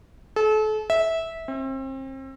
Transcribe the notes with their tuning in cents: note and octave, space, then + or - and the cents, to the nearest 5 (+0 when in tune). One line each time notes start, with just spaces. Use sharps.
A4 -35
E5 -15
C4 +35